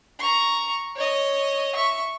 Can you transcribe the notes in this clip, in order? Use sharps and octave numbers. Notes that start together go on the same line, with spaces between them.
A#5 C#6
C#5 D#5
E5 C#6